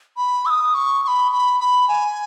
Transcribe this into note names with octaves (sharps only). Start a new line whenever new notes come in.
B5
E6
D#6
C#6
C#6
B5
B5
B5
G#5